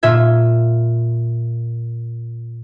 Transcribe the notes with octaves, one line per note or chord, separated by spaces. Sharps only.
A#2 F4 E5 G#6